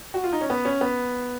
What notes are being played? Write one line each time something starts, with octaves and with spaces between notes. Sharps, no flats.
F#4
F4
D#4
C#4
B3
C#4
B3